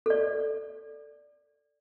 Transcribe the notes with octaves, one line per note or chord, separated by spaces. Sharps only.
A4 D5